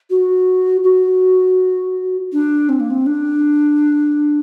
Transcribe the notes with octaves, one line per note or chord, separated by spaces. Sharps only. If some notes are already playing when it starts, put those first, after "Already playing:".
F#4
F#4
D4
C4
A#3
C4
D4